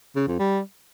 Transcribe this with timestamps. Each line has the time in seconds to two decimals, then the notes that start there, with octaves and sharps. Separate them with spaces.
0.16 C#3
0.28 F2
0.39 G3